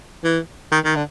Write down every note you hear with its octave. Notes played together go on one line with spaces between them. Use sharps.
E3
D#3
D#3
D3